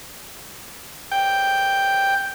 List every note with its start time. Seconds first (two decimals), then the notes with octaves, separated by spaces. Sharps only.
1.12 G5